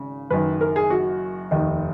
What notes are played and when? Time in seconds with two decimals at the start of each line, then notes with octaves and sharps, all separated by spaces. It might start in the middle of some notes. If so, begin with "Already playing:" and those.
Already playing: G#1 C#3
0.30 F#1 F#2 D#3 B4
0.61 A#4
0.76 G#4
0.90 F#4
1.51 F1 D#2 D#3 D#4